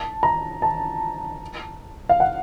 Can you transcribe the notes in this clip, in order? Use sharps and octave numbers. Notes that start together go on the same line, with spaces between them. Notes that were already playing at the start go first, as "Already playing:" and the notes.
Already playing: A5
A#5
A5
F5
F#5